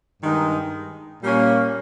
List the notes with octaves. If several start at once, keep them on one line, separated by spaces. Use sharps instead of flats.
G2 D#3 G#3 D#4
A#2 G3 A#3 C#4